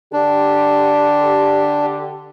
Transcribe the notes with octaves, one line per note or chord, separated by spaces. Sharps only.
D3 D4 G4